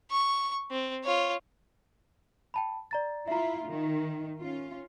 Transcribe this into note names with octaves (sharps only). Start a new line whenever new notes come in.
C#6
C4
F4 C#5
G5 A5 B5
D5 A#5 A6
E4 F4 E5 A#5
D#3
C#4 F4